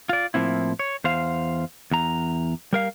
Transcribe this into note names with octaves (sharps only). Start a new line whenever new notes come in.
F4 D5
A2 F3 A#3 C4 E4
C#5
E2 C5 F5
E2 A#5
G3 A#4 F5